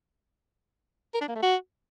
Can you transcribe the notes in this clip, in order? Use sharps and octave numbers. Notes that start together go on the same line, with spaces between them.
A#4
D4
A#3
A3
F#4